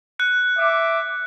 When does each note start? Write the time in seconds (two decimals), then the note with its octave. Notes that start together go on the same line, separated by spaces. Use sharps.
0.19 F#6 C#7
0.58 E5 D6